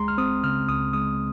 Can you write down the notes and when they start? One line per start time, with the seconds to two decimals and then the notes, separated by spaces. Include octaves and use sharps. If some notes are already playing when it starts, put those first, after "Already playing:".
Already playing: C#2 G#3 A#5 C6
0.08 F6
0.18 C4 D#6
0.44 C#3 F6
0.69 C#2 D#6
0.93 G#3 D#6